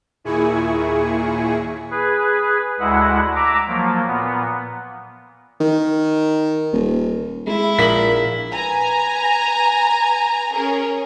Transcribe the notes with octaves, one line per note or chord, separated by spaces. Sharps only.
D#2 A#2 E4 G#4 G#5 C#6
G#4 B4
D2 G#3 E4 F#5
E5 A#5 D6
F3 F#3 A#3
A#2 B3
D#3
D#1
G#3 E4
A#1 A#2 A#3 B6 F#7
B4 G#5 A#5
C#4 G#4 A#4